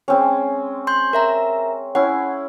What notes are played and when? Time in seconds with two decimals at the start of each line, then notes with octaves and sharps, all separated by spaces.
0.08 G#3 C4 C#4
0.87 C6 G6
1.13 A#4 E5 A#5
1.95 C#4 E4 F#5